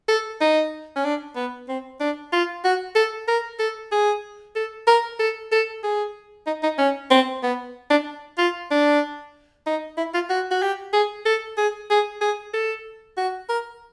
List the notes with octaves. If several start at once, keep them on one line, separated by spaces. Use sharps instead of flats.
A4
D#4
C#4
D4
B3
C4
D4
F4
F#4
A4
A#4
A4
G#4
A4
A#4
A4
A4
G#4
D#4
D#4
C#4
C4
B3
D4
F4
D4
D#4
E4
F4
F#4
F#4
G4
G#4
A4
G#4
G#4
G#4
A4
F#4
A#4